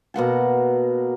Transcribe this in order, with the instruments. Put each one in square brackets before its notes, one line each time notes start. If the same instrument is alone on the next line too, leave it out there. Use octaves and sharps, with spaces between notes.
[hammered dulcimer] B2 A#3 F#5 A5